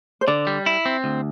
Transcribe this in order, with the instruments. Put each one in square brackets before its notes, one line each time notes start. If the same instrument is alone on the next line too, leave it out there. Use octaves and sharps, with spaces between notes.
[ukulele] C5
[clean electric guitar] D3 [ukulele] D5
[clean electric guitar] G3
E4
C4
D2